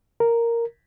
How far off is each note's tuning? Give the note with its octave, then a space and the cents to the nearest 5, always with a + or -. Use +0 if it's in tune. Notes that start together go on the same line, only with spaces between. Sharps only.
A#4 -5